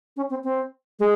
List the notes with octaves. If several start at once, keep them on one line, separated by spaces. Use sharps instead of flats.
C#4
C4
C4
G#3